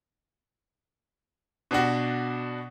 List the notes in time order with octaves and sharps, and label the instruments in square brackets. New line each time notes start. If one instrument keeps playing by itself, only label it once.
[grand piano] B2 D4 F#4